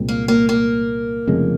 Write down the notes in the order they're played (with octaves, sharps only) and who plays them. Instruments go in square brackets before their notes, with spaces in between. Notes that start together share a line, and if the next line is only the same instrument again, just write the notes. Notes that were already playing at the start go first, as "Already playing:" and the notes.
Already playing: [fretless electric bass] C2 A#2 G#3 C4
[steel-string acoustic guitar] A#3
A#3
A#3
[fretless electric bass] F1 F2 C#3 G#3